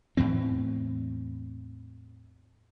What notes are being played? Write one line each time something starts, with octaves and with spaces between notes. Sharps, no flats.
E2 A2 E3 C4